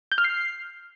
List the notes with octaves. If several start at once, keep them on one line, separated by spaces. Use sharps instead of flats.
G6
F6
C7